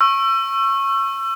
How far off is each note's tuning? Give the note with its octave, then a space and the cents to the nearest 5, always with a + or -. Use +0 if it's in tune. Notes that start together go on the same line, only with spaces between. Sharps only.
C#6 -20 E6 +30